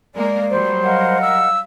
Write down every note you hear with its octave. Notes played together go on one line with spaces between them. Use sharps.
G#3 A#3 A#4 D5
F#3 G3 C5
A#4 D#5 F5 F#5
E6